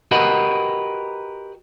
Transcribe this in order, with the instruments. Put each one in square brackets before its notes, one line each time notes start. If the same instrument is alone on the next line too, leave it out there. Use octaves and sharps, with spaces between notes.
[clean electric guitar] F#4 G4 A#4 B4 D#5 F#5